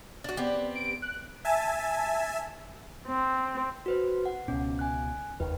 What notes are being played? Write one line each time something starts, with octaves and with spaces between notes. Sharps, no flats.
D4 F#4
B3 C4 G4 D5
D7
F#6
E5 G#5 A5
C4
F#4 B4 C5
F#5
C#2 B2 C#4
G#5 F#6
F1 D#2 D#3 B4